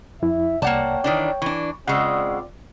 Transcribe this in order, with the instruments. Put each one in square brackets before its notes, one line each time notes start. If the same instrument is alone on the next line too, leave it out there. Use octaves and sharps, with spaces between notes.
[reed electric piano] F2 E4 [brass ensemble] E5
[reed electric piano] C2 D5 [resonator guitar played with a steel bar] A#3 F#5 A5 [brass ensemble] C#5 G5
[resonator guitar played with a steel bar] D#3 E3 D4 [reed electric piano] D5
[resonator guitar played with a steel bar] E3 D4 [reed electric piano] C#6
[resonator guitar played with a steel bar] C#3 G#3 [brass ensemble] C4 F4 D5 [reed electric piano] F#5 C#6 E6